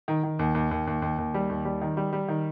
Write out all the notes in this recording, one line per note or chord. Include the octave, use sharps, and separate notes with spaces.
D#3
D#3
D#2
D#2
D#2
D#2
D#2
D#2
G3
D#2
G3
D#3
G3
G3
D#3